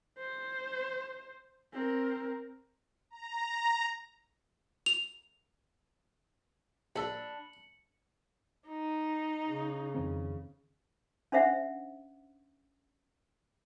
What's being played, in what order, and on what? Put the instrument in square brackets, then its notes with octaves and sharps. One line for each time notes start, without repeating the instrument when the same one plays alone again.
[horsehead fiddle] C5
C4 A#4
[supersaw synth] A#5
[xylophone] F7
[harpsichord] A#1 A4 [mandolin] D4 B5 [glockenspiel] C#7 F#7
[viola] D#4
[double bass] C#3
[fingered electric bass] F2 D#3 C4
[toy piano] C#4 D4 C5 E5 F#5